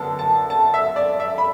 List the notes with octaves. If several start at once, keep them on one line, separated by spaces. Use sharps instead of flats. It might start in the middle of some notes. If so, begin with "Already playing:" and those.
Already playing: F#2 D3 B3 A5
A5
A5
E5
D5
E5
B5